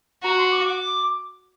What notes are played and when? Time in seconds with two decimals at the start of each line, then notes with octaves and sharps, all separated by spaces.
0.23 F#4 A#5
0.37 C6
0.51 D6
0.65 D6